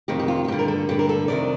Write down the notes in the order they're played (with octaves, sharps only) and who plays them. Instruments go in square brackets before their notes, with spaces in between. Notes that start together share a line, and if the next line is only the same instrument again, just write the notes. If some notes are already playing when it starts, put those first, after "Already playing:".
[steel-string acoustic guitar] F2 C3 D#3 G4
G4
F4
F4
G2 D3 G4
A#4
A4
G2 D3 G4
A#4
A4
F2 C3 D#3 D5